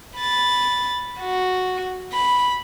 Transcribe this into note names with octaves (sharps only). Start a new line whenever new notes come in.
B5 A6
F#4
B5